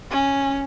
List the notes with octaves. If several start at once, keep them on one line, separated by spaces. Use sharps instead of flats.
C#4